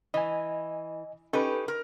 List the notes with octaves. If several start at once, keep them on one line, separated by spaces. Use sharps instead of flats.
E3 D#5 G#5
C#4 D#4 G4 A4 B4 B5
A#4